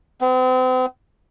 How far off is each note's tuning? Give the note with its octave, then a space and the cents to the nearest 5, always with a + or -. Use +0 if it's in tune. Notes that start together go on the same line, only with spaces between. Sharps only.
C4 -40